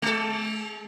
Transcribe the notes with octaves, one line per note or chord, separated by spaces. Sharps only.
G#3 A4